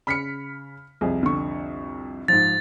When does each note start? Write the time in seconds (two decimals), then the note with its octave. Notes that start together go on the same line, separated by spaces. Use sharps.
0.07 C#3 B5 F6 B6 C#7
1.01 C2 F2 G#4
1.23 D3 C#6
2.28 G#2 F3 A6